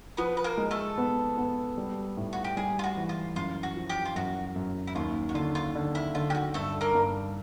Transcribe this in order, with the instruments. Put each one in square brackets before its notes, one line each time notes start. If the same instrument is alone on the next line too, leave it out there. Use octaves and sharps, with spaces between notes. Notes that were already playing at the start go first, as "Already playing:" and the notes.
[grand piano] F3 [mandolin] B3 B4
[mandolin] B4
A#3 A#4
[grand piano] G#3
[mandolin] A3 A4
[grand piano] B3
B3
G3
A2
[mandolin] F#4
G4
[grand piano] G3 [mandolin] G#4
[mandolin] F4
F#4
[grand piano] E3
[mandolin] F4
[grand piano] F#2 [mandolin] F4
[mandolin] F#4
[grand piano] F3
[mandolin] G4
F4
[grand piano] F#2 [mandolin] F#4
[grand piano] F#2
[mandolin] E4
[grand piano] D#2 [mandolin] F4
[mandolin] F#4
[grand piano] D3 [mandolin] F4
[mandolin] F4
[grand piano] D3
[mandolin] E4
[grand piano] D3 [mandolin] F4
[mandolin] G4
F#4
[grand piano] G2 [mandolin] A3 A4
[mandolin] A#3 A#4
[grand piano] G2